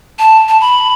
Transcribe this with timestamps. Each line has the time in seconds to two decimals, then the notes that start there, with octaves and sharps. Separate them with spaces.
0.19 A5
0.48 A5
0.60 B5